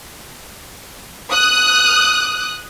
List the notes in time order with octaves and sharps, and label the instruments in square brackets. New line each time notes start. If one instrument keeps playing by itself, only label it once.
[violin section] D#6 F#6